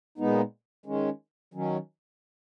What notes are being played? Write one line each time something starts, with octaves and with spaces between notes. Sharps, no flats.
A#2 G#3 B3 D#4
D#3 G#3 C#4
D#3 F#3 C#4